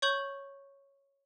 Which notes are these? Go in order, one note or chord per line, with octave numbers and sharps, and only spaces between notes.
C#5 C#6 G6 F#7